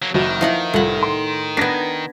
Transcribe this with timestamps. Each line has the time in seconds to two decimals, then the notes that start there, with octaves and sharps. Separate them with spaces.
0.02 F#3 A#3
0.14 F#1 D#3 F#4
0.41 F3 D#4 E4 F#5
0.74 C2 A2 F4 F#5
1.03 C6
1.57 B3 D4 G#6 A#6 B6